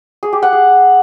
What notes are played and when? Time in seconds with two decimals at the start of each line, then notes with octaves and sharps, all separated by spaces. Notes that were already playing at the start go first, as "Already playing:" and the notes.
0.23 G#4
0.33 G4
0.43 F#5
0.52 G#4